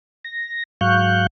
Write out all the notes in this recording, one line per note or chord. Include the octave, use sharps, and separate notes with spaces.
A#6
G#2 F#3 F5 C#6 F#6 G6